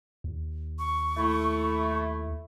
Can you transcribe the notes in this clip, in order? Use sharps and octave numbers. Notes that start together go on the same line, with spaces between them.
D#2
C#6
A3 E4